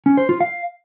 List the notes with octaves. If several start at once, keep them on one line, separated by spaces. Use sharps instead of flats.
C#4
C5
F4
F5